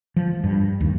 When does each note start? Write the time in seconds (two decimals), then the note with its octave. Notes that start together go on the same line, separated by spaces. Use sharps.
0.16 F3
0.44 G2
0.81 D#2